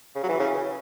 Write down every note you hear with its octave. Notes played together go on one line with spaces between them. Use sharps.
C#3
F#3
E3
C#3